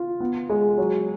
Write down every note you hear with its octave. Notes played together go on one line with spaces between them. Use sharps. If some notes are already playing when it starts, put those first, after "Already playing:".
Already playing: F4
B3
G#3
F#3